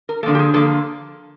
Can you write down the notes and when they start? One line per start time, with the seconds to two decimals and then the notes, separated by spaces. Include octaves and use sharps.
0.09 A#4
0.23 D3 F3 A#3 A4
0.35 G4
0.39 G#4
0.54 D3 F3 A#3 A4